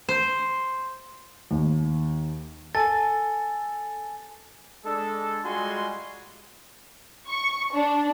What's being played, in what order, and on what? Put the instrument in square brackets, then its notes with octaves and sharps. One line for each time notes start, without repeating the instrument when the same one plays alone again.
[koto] C5
[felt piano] D#2
[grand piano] A4 [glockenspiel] G#5 A6
[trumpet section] G#3 D4 A4
G3 G#3 F4 F#4 G#5 C6
[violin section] C#6
D4